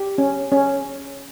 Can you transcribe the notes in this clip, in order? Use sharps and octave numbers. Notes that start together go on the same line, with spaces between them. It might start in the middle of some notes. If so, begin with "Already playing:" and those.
Already playing: G4
C#4
C#4